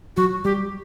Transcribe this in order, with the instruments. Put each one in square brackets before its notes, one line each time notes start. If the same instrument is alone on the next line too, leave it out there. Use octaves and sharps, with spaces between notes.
[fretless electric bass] F#3 [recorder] F#4
[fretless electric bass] G3 [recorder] G4